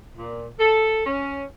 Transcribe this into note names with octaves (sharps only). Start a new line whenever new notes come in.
A#2
A4
C#4